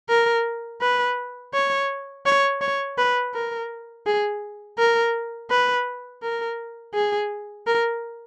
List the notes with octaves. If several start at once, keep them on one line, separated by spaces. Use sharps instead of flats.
A#4
B4
C#5
C#5
C#5
B4
A#4
G#4
A#4
B4
A#4
G#4
A#4